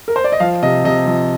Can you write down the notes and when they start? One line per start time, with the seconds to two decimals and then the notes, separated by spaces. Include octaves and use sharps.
0.08 A#4
0.16 C5
0.24 D5
0.32 D#5
0.40 F3 F5
0.63 C3 D#5
0.84 C3 D#5
1.07 F3